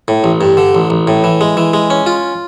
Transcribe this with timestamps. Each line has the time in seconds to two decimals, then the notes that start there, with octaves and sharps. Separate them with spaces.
0.08 A2
0.24 A1
0.41 G2
0.57 D3
0.75 A1
0.90 A1
1.07 A2
1.24 E3
1.41 G#3
1.57 E3
1.74 G#3
1.90 C#4
2.06 F4